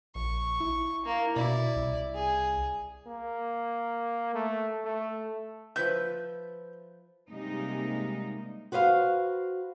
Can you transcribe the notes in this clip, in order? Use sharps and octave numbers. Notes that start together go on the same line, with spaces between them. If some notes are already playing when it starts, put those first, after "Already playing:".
A#1 C#6
E4
A#3
B2 E4 D5
C2
G#4
A#3
A3
A3
F3 B4 E5 G6
C3 G3 G#3 A#3 D#4
F#4 B4 C5 D#5 F5